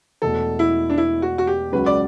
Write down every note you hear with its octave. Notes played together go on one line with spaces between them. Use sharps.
E1 E2 B2 A3 A4
E4
D4
E4
F#4
F#4
G4
C#2 C#3 F#3 C#4 F#4 B4
D5